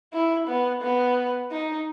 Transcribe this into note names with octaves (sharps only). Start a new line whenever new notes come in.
E4
B3
B3
D#4